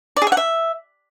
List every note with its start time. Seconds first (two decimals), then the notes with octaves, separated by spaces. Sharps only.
0.17 D5
0.22 G#4
0.27 E5
0.32 F#5
0.37 E5